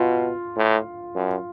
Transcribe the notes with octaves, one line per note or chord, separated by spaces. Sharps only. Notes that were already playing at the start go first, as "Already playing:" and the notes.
Already playing: B2 F4
A2
F#2